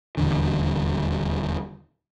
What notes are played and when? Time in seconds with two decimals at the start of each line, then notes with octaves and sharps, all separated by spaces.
0.17 D#1 A1 E2 D3